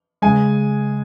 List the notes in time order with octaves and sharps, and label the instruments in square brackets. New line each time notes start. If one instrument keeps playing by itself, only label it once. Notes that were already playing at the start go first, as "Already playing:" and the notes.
[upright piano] C#3 G#3 G#5